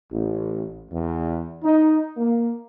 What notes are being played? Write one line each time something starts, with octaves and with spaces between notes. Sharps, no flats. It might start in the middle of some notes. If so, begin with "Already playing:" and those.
A1
E2
D#4
A#3